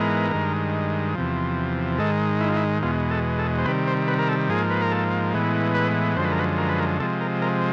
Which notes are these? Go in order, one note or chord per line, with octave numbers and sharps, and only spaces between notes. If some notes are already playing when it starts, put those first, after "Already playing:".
Already playing: G#2 E3 G#3 B3 A#4
G2 D#3 G#3
E2 C3 F3
G#2 D#3 G#3 A4
E4
F4
E4
E2 B2 G#3 F4
A4
A4
C5
C3 D#3 G3 B4
C5
B4
A#4
A4
G#2 F3 A#3 G#4
B4
A#4
A4
A2 E3 G#3 B3
B4
F#2 D3 F3 G#3 C5
B4
A#4
B4
A#4
B4
A#4
C3 F3 G#3 A4
A#4
A#4